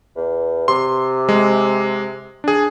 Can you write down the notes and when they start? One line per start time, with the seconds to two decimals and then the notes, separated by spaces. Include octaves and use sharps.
0.16 E2
0.68 C3 C6
1.29 G#3
2.44 D4 G#4